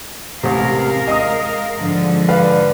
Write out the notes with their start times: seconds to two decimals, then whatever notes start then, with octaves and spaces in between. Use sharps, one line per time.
0.43 A1 C3 G#3 A#4 F5
1.08 D#5 D#6
1.77 G#2 D3 F3
2.29 B4 D5 F5